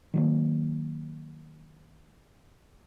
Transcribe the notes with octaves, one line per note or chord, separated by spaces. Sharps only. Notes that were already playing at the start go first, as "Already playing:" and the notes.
D#3 F#3 A#3